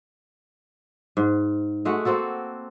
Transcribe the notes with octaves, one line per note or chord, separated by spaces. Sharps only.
G#2
G#3 A3 F#4 F#5
A#3 C4 F#4 A4